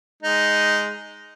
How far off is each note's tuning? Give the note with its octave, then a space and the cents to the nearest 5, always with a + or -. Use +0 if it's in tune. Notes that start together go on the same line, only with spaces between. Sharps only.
G#3 +0 D#4 +0